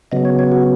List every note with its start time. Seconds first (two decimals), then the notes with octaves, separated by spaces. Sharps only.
0.12 C#3 F#3 B3 D#5
0.25 C#5
0.39 C#5
0.52 F#4